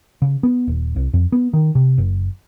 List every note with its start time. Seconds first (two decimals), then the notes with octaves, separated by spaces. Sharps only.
0.22 C#3
0.43 B3
0.68 D#1
0.96 C2
1.14 F2
1.32 B3
1.53 D#3
1.75 C3
1.98 F#1